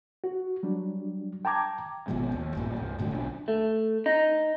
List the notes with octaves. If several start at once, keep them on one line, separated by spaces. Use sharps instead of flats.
F#4
F#3 G3 D4
G5 A5 A#5 D6 G#6
G#1 B2 F3 G#3
D#2
A1 G2 A#2 G3
C2 G2
D#1 A2 D3 F#3
B1 D4
A3
D#4